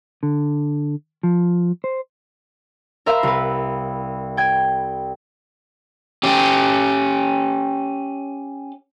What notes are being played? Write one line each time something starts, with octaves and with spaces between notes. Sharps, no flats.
D3
F3
C5
A#4 C5 E5 F5 B5
C2 B4
G5 G#6
C#4 G4